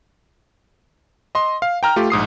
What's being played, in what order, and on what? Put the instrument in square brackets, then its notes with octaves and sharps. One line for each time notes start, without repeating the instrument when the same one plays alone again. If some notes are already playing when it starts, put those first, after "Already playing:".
[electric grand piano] D#5 C6
F5
G5 A#5 F6
A3 F4 G4
A#1 G#2 D#6 C7